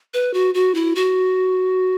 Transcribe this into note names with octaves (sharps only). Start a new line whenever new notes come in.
B4
F#4
F#4
E4
F#4